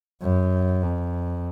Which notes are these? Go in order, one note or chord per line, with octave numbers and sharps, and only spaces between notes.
F#2
F2